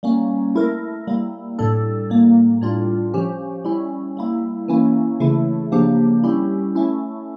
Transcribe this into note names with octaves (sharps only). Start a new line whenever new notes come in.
G3 A#3 C#4
A3 E4 A#4
G3 A#3 E4
A2 G3 D4 A4
A2 G3 A#3
A2 G3 D4 F4
F3 C#4 G4
G3 C#4 E4
G3 A#3 E4
E3 A#3 C#4 E4
C#3 E3 A3 E4
C#3 F3 A#3 D4 G4
G3 C#4 E4 G4
A3 C#4 E4